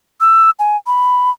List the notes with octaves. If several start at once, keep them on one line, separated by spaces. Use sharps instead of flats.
E6
G#5
B5